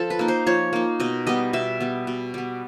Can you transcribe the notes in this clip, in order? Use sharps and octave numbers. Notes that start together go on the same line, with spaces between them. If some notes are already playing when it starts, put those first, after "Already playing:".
Already playing: F3 A4
B4
A#3 D#4
C5
F3 C#5
A#3 D#4
B2 D#5
G3 B3 D#5
B2 E5
G3 B3
B2
G3 B3